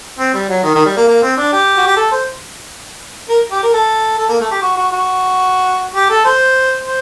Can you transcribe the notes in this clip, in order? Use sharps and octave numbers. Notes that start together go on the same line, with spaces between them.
C4
G3
F#3
D#3
D#3
G3
A#3
A#3
C4
D4
G4
F#4
G4
A4
C5
A#4
G4
A#4
A4
A4
A#3
A3
G4
F#4
F#4
F#4
G4
A4
C5
C5